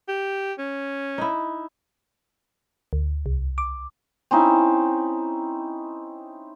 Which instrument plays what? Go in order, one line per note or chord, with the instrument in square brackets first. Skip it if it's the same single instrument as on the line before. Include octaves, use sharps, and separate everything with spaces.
[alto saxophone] G4
C#4
[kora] D#4 E4
[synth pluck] D2
C2
D6
[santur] C4 C#4 D#4 E4